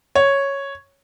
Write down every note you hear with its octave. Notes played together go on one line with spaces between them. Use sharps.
C#5